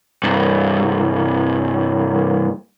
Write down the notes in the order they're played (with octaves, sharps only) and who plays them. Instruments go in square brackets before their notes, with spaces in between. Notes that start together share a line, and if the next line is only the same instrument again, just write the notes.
[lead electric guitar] C2 G2